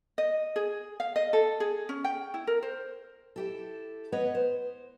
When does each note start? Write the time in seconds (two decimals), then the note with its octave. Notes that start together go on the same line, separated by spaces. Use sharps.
0.18 D#5
0.56 G#4
1.00 F5
1.16 D#5
1.33 A4
1.60 G#4
1.89 C#4
2.04 G5
2.34 E4
2.47 A#4
2.63 C5
3.36 E4 G4 A4
4.12 B3 B4 C#5 D#5
4.35 C5